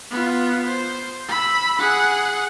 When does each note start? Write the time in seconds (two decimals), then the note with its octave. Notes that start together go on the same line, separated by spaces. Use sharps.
0.11 B3 F4
0.67 C5
1.29 B5 E6
1.79 G#4 F#5